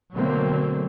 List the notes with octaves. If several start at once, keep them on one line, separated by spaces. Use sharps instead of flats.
B2 D3 F#3 A3 A#3 C4